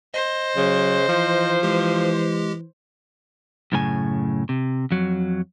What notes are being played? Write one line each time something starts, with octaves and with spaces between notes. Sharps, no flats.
C5 D#5
C#3 F#3
E3 F3
E3 G#3 G4
F#2 A2 C#3 A#4 G#5
C3
F2 F#3